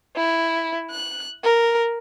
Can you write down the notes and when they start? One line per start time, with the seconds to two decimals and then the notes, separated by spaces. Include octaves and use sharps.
0.16 E4
0.91 F#6
1.44 A#4